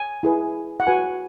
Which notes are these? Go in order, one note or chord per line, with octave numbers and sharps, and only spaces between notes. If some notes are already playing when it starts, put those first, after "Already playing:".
Already playing: G#5
E4 G#4 B4
F#5
F#4 B4 G#5